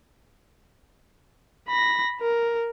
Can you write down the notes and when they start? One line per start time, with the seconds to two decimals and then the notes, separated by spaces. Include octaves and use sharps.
1.68 B5 A#6
2.21 A#4